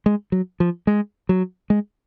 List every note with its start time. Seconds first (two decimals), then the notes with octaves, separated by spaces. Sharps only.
0.06 G#3
0.32 F#3
0.60 F3
0.87 G#3
1.29 F#3
1.70 G#3